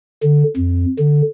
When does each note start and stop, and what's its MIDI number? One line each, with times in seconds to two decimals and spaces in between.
0.23 0.44 50
0.57 0.86 41
0.99 1.22 50